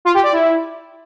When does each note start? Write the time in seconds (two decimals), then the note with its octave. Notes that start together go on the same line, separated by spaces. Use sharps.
0.05 F4
0.14 G4
0.23 D5
0.32 E4